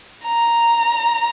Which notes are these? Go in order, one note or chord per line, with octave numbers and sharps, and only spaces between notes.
A#5